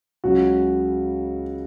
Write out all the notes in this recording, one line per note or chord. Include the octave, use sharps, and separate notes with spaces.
C#2 C#3 F#3 F#4